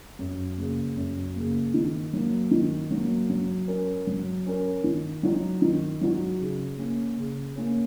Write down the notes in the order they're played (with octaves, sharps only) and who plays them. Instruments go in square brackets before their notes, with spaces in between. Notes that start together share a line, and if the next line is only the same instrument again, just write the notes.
[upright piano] F#2
C#3 A#3
F#2
C#3 A#3
D#3
F#3 A#3
D#3
F#3 A#3
F#3
C#4 A#4
F#3
C#4 A#4
D#3
F#3 D#4 F#4
D#3
F#3 D#4 F#4
C#3
A#3 C#4
C#3
A#3 C#4